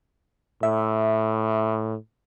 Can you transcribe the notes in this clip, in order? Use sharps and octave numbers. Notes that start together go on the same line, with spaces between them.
A2 E5